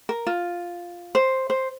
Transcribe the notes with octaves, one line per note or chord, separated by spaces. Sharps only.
A#4
F4
C5
C5